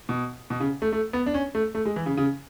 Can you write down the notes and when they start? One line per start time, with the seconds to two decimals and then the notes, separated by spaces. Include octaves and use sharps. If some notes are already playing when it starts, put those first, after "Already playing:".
0.09 B2
0.50 B2
0.60 C#3
0.82 A3
0.92 A3
1.13 B3
1.26 D4
1.34 C#4
1.55 A3
1.75 A3
1.85 G#3
1.96 E3
2.06 C#3
2.17 C#3